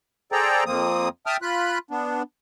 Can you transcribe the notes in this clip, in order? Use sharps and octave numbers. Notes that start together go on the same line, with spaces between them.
G#4 A4 C5 D5 G5 A#5
F2 F3 A#3 C4 D#6
E5 G5 A5 D#6 F6
F4 B5 F#6
B3 D4